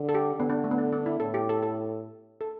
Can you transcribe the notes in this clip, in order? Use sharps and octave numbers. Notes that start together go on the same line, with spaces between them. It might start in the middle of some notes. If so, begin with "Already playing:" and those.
Already playing: D3
A4
G4
D3 B3
D4
A3
B3
D4
D4
E4
A2 A4
G4
A4
A4
A4